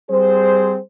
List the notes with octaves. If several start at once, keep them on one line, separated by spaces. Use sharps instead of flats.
G3 C4 G#4 C5